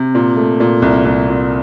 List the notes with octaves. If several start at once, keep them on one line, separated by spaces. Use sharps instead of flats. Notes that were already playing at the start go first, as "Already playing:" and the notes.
Already playing: C3
A#2
A3
A#2
C2
C2
A#2